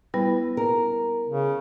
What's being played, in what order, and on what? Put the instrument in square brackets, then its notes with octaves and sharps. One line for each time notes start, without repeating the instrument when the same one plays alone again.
[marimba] G3 B3 E4 [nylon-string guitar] B4
[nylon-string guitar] A#4
[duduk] C#3